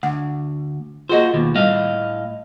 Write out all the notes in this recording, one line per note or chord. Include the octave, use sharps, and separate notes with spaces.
D2 F#5
A#3 F4 F#4 G#4 C5 D#5
D#2 B2
A2 G3 D#5 F5